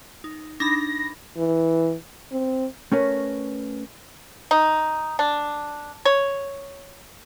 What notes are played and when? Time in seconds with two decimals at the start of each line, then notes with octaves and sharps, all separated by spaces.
0.24 D#4
0.60 D4 D#4 B5 A#6
1.38 E3
2.32 C4
2.92 A3 C#4 A#4 B4
4.51 D#4
5.19 D4
6.05 C#5